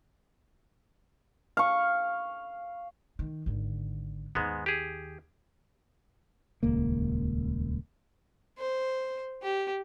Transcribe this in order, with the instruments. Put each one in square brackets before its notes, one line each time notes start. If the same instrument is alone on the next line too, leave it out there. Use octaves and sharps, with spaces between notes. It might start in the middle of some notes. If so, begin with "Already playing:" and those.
[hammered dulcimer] F5 C#6
[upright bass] D#3
G#1 D3
[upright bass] D#2 [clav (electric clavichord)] G#2 G#3 B3
[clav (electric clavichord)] G4 G#4
[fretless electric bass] D#1 C#2 A#3
[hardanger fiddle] C5
G4